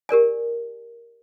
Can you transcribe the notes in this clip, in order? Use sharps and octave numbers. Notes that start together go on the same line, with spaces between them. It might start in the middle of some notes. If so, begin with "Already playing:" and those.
G4 A#4 D5 G#5